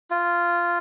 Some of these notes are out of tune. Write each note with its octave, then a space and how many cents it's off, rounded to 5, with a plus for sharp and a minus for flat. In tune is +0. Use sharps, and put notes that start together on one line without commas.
F4 -10